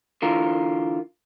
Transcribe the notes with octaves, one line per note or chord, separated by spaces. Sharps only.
D3 E3 F4 A#4